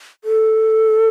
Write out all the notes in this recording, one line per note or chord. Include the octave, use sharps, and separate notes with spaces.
A4